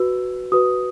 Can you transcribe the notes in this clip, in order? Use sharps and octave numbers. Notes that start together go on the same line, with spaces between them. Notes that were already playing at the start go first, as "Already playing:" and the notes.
Already playing: F#4 B4 E6
F#4 B4 D#6